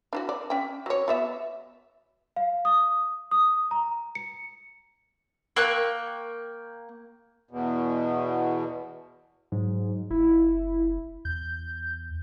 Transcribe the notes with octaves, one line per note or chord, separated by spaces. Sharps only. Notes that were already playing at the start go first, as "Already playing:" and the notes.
D4 E4 F#4
D5
C#4 G5
F#3 C#5
F#3 B3 E5
F5
D#6
D#6
A#5
C#7
A#3 G5 C#6 F#6
E2 B2
G#2 F#3
F#1 E4
E2 G6